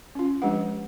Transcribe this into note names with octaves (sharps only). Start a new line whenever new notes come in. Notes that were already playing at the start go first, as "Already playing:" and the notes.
C#4 F4
F3 G#3 D4 G4 B4 F#5